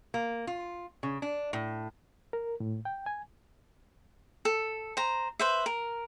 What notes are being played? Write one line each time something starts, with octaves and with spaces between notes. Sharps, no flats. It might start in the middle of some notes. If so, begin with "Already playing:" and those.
A#3
F4
C#3
D4
A2
A#4
A2
G5
G#5
A4
C5 A#5
B4 C5 E5
A#4